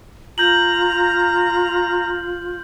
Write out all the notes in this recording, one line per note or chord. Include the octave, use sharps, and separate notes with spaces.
F4 A#5 G6 F#7